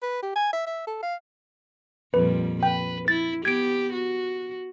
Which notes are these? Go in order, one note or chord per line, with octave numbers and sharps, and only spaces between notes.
B4
G4
G#5
E5
E5
A4
F5
F2 A#2 G3 B4
B4 G5
E4 A6
B3 G4 G#6 D7
F#4